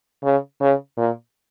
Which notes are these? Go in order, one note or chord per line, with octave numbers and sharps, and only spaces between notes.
C#3
C#3
A#2